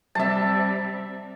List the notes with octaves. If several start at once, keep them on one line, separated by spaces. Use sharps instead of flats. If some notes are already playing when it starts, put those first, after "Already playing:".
C3 G3 E5 A5